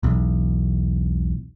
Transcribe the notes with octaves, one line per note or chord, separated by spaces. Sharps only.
E1 B1